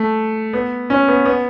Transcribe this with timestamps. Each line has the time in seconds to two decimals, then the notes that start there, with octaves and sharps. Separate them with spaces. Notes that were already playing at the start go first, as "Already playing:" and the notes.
Already playing: A3
0.53 B3
0.90 C#4
1.08 B3
1.25 B3